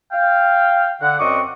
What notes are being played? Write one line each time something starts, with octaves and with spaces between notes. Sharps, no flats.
F5 G5
D3 F#5
F#2 C4 D5 D#5 C#6 D6